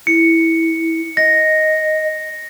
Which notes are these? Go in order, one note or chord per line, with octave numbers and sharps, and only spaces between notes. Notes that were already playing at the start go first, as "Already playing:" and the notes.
E4 C#7
D#5 A#6